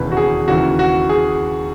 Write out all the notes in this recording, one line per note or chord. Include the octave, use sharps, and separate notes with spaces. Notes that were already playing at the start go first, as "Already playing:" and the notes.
Already playing: E1 D#2 C#3 E3 B4
F#4
G#4
D#2 C#3 E3 F#4
F#4
G#4